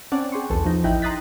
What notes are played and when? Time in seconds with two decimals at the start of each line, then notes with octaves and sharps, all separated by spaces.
0.12 C4 C#4 D5 F#5 A5
0.32 G#4 G5 C6 C#6
0.50 B1 E2 A4
0.65 F3 D#4
0.84 A1 D#4 E4 G5 F#6
1.02 A#5 C6 D#6 F#6 A6 B6